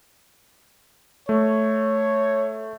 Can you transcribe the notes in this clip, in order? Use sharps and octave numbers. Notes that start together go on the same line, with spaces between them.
A3 C#5